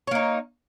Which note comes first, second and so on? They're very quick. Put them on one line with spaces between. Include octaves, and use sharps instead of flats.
C#5 A#3 D#4